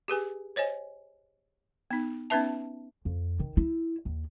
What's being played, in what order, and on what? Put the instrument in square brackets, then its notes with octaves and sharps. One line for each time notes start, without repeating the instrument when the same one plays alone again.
[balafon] G4 G#4 B4 G#5
C5 C#5 D#5 G#5
B3 D#4
B3 C#4 D#4 B4 E5 A5
[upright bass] F2
D#3
E4
D#2